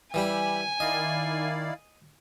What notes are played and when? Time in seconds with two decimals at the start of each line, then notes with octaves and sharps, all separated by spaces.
0.14 E3 G3 G4 G5 G#5 B5 E6
0.80 D#3 E4 D5 D#5 F5